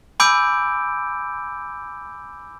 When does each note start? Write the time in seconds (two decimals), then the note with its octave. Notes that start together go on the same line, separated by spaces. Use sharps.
0.20 G#5 B5 D6 E6 G6 D7